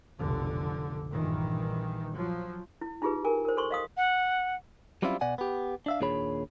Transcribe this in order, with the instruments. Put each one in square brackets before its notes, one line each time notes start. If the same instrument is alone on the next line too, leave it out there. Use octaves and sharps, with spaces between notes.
[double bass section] F1 B1 D3
A#1 G2 A#2 D#3 E3
F3 F#3
[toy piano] E4
D#4 F4 G4 G#4 B4
A#4 G#5
A#4 C5
A4 C5 C6 C#6
D#5 F5 D#6
[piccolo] F#5
[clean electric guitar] F#3 G3 C4 C#4 E4 F4
B2 D5 F#5 G#5
B3 G4
D4 E5 F5
D#2 A#2 D4 G#4 C#5 B5